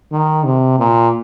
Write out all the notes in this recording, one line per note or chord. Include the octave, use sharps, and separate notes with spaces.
D#3
C3
A#2